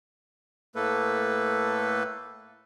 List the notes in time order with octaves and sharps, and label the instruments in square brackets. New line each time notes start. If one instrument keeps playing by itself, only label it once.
[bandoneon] A2 A3 A#3 A4 B4